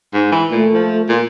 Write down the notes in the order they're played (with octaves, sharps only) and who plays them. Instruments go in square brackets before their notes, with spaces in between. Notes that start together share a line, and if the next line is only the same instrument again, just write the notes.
[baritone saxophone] G#2
E3
[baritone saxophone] A#2 [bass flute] A3
[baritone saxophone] F3
[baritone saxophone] A#2 [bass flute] F4